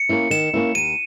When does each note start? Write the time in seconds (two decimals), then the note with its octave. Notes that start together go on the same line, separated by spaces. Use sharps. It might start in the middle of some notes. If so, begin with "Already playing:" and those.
Already playing: C#7
0.09 A#3 C#4 E4
0.30 D#3 E7
0.53 A#3 C#4 E4
0.75 D#2 D#7